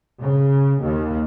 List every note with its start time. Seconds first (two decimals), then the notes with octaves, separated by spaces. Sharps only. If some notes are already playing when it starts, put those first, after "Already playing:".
0.21 C#3
0.82 D#2